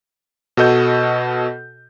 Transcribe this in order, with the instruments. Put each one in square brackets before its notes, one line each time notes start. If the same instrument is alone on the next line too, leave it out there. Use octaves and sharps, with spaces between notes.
[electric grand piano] B2 F#4 A4 D#5 G6